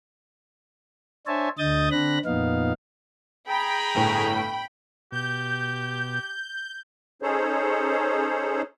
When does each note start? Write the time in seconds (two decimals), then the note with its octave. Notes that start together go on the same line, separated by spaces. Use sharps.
1.27 D4 C5 C#5 E5 G#5 A5
1.58 D2 D3 D#5 D#6 G6 A6
1.91 D3 C4 D4 B5 F#6 A#6
2.25 F2 A#2 B3 D#4 F5
3.49 G#4 G5 A#5 B5
3.95 G1 A2
5.12 B2 G4 G6
7.22 C#4 D#4 G#4 A4 C5 C#5